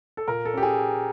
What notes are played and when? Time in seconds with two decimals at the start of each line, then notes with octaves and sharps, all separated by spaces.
0.17 A4
0.28 A#2 A#4
0.45 A4
0.54 C#4 G4
0.63 G#4